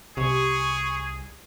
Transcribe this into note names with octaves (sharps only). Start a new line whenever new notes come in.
C2 G4 G#4 C#6